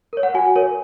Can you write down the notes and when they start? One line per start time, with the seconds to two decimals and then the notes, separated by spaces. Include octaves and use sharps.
0.13 A#4 C#5
0.23 F#5
0.34 F#4 G#5
0.56 A#4 C#5